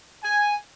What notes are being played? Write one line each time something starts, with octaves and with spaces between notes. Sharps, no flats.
G#5